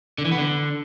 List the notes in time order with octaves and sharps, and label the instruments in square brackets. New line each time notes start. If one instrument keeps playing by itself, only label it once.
[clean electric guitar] D3
E3
B3
D3